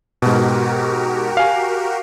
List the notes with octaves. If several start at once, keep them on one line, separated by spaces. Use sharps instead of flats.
G#2 B2 F#4 G4 A#4
F5 G#5